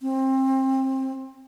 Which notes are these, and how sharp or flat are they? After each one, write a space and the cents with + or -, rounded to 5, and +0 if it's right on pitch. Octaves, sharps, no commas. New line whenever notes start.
C4 +25